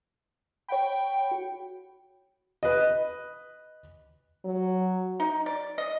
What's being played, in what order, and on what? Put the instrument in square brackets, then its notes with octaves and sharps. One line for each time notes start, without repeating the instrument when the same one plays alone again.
[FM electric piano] C#5 F#5 B5 [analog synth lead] G5
[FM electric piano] F#4
[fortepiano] B4 D#5
[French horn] F#3
[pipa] D#4
D5
D#5